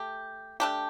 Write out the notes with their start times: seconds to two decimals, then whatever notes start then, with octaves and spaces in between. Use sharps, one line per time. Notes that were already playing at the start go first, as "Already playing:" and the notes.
Already playing: A3 G4
0.60 A3 D4 G4